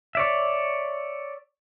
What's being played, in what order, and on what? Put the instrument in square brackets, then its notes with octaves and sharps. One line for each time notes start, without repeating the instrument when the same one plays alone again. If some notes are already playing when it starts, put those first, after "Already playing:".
[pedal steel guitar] C#5 D5 E5